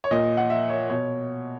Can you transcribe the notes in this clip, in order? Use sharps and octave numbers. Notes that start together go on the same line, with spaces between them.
C#5
A#2 D#5
F#5
E5
C#5
B2 C#5